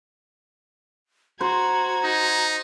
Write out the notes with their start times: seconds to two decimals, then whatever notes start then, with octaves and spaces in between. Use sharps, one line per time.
1.41 F#4 C5 A#5 G#6
2.04 D#4